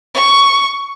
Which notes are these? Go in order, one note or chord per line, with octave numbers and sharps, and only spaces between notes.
C#6